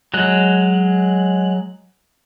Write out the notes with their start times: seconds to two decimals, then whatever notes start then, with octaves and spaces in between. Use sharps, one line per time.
0.14 F#3 G#3 F#6